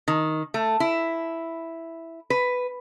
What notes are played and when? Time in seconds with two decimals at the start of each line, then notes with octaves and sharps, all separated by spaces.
0.08 D#3
0.54 A3
0.80 E4
2.30 B4